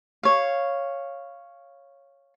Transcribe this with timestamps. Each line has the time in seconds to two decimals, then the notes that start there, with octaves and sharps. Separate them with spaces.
0.23 C#5 F5